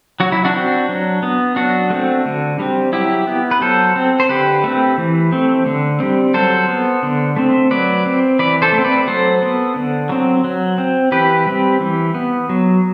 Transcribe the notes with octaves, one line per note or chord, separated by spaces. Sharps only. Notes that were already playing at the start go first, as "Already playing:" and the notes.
F#3 F#4
E4
D4 F#4
C4
F#3
B3
F#3 D4 F#4
A3 C4
D3
G3 C4
F#3 E4 G4
B3
B4
F#3 A4 C5
C4
C5
D3 G4 B4
A3 C4
E3
A3 C4
D3
G3 C4
F#3 A4 C5
B3
D3
A3 C4
F#3 B4 D5
C4
E3 B4 D5
A4 C5
A3
C4
B4 D5
F#3 A4 C5
B3
D3
F#3 C4
F#3
C4
E3 G4 B4
G3 C4
E3
B3
F#3